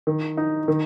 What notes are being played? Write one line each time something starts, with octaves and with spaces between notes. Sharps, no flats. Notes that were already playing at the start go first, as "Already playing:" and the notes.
D#3
D#4
D#3